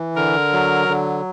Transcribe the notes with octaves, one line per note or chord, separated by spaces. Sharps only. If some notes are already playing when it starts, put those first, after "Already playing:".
Already playing: E3
D3 A#4
F#3
D3